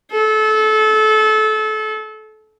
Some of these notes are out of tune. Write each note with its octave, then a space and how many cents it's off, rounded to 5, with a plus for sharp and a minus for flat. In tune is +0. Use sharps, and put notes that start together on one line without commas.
A4 -25